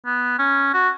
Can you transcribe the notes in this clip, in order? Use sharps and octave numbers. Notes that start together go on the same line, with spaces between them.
B3
C#4
F#4